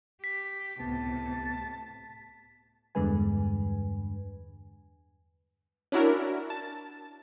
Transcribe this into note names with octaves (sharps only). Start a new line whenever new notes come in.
G4 B6
C#2 A2 C3 B3 A5
E2 G2 D3 G#3 B4 G#5
C#4 D4 E4 F#4 A#4
A5